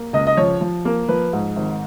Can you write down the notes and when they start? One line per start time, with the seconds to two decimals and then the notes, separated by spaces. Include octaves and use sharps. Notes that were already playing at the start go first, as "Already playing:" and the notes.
Already playing: A#3
0.13 C#2 D#5
0.27 D#5
0.37 F3 C#5
0.61 F3
0.85 A#3
1.09 F3 B4
1.33 G#2
1.56 G#1